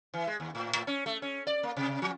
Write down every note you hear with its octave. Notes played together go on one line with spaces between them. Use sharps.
E3
G#3
D#2
A2
A2
C#4
A3
C#4
D5
A#3
C3
F3